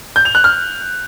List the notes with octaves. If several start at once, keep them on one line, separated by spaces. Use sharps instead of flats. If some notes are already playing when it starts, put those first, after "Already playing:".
G6
F7
F#6
F6